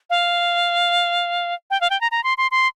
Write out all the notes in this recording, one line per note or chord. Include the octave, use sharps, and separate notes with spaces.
F5
G5
F5
G5
A#5
A#5
C6
C6
C6